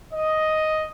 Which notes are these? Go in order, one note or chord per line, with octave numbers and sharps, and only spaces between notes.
D#5